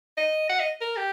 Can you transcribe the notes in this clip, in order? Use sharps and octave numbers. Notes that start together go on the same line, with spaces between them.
D#5
F#5
D#5
A#4
G4